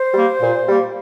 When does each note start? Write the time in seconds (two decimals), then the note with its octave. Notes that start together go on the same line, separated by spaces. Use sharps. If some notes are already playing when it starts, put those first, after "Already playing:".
Already playing: C5
0.14 G3 A#3
0.41 A#2
0.68 G3 A#3